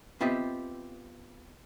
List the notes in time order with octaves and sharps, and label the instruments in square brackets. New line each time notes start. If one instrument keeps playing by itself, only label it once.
[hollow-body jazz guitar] B3 C4 F4 G4 D#5 E5